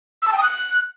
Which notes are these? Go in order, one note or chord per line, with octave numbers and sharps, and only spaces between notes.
E6
A5
G5
D#6
F#6